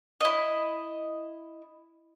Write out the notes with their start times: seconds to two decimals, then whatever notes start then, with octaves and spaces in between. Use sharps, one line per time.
0.21 E4 D#5